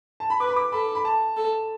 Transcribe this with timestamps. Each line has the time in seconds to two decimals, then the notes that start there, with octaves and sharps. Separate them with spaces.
0.20 A5
0.30 B5
0.40 B4 D6
0.49 B5
0.56 D6
0.72 A4 B5
0.95 B5
1.05 A5
1.37 A4